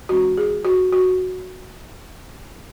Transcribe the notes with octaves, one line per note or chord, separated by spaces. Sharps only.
E3 G#3 C#4 F#4
G#4
F#4
F#4